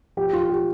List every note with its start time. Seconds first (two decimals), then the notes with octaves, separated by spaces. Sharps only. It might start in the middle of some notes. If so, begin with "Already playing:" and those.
0.17 F3 G4
0.33 F3 F4
0.50 G4